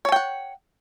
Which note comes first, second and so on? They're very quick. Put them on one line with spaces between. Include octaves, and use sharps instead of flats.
C#5 A5 G5 F#5